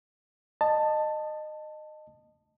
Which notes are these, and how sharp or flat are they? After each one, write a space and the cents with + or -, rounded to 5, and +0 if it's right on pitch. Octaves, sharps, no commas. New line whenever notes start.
D#5 -20 A5 +10